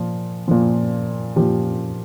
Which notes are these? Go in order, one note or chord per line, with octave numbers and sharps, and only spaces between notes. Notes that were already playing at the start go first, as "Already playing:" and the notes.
Already playing: A#2 F3
A#2 F3
A#2 F3 G4